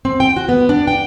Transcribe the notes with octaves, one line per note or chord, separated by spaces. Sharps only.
C4
G5
F#4
B3
D4
G5